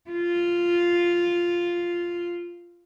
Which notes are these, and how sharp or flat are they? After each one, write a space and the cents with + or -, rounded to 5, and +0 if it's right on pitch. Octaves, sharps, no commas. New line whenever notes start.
F4 -5